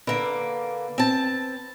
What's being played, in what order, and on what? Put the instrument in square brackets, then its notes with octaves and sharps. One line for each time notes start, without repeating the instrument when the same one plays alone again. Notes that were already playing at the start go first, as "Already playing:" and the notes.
[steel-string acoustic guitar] D3 A#3 [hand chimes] B4 B5 D7
[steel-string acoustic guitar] C4 A5